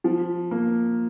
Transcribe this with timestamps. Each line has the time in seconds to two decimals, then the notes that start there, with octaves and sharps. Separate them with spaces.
0.04 F3
0.51 A#3